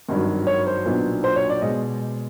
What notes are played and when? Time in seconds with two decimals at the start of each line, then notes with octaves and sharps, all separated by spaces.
0.09 G#1 G2 D#3 F#3
0.47 C#5
0.67 C5
0.86 B1 A#2 F#3 B3 D4
1.24 C5
1.36 C#5
1.50 D5
1.62 B2 G#3 D#5